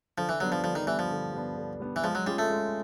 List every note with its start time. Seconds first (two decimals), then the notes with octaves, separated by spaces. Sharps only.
0.18 D3 F3
0.29 E3
0.40 F#3 G3 B3 D4
0.52 F3
0.64 D3 F3
0.75 D#3
0.87 E3 G3 B3 D4
0.99 F3
1.10 D3
1.33 G3 B3 D4
1.57 D3
1.80 G3 B3 D4
1.96 E3
2.04 F3 G#3
2.15 F#3
2.26 G3 C#4 F4 G#4
2.39 A3
2.50 G#3